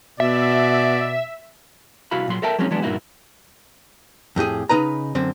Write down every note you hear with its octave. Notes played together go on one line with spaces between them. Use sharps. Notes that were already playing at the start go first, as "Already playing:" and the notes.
B2 D5 E5
C2 E4 F#4 F5 B5
A#2 F#3 C6
A4 A#4 E5 G5 A5
F#3 G#3 C4 C#4 D#4
E3 F#3 G#3 B3 D4
G2 A#2 A#3 D#4 E4 F#4
F2 A2 G4 G#4
C#3 D#4 B4 A#5
F#2 D3 C4